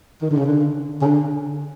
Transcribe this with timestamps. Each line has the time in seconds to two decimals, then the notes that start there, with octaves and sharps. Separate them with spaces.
0.22 D#3
0.30 D3
0.37 C#3
0.46 D3
1.01 C#3
1.06 D3